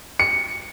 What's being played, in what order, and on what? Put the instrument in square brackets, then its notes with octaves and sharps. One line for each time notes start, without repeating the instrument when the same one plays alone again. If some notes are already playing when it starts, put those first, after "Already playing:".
[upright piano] C#7